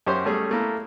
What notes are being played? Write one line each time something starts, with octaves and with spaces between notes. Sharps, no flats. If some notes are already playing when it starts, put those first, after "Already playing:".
F#2 C#4 G4 C5 C#5 C6
G3 A3 C#4 G#4
A3 A#3 E4